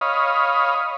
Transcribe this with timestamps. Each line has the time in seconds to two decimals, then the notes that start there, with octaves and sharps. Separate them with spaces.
0.01 C#5 D#5 F5 B5